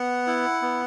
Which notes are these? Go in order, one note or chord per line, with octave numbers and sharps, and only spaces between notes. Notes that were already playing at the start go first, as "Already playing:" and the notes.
Already playing: B3 F#5
E4
B3